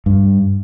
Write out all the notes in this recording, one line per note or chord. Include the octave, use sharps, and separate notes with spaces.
G2